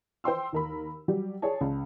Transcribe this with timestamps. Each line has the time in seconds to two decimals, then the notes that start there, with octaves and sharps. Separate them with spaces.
0.24 C5 G5 C6 E6
0.53 D#2 A#4 B5
1.08 F#3 G3 G4
1.42 G#4 C#5 D5 A5
1.61 C#2